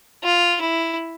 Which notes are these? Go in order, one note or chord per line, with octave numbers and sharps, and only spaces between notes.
F4
E4